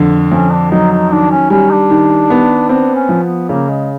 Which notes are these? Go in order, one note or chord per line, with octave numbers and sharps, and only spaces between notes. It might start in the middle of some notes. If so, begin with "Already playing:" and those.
Already playing: F2 D3
F2 C#4
D4
F#3 D#4
D#4
D#3 D4
C#4
G3 C#4
D4
D#3
B3
C4 D4
C#4
F3
B3
C#3 A#3
G#3